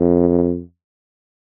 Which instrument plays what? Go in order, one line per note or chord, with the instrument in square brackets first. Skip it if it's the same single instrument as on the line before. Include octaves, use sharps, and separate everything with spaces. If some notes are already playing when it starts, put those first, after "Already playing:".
Already playing: [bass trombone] F2